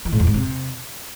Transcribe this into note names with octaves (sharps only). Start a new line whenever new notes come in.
E3
G#2
E2
G#2
C3